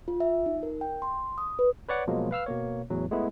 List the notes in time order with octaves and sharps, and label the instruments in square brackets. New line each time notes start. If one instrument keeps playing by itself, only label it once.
[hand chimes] F4
E5
D#4
A#4
G5
C6
D#6
B4
[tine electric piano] B4 C#5 D5 F#5
B2 F3 F#3 G#3 A#3
B4 F5 E6 F6
B2 A#3 C#5
E2 A2 F#3
G#3 A3 B3 E4